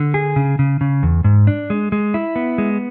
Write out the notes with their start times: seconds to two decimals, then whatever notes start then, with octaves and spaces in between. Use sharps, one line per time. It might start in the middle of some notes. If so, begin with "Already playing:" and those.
Already playing: D3
0.14 G#4
0.36 C#3
0.59 C#3
0.81 C#3
1.03 E2
1.24 G#2
1.47 D4
1.70 G#3
1.92 G#3
2.14 E4
2.36 B3
2.58 G#3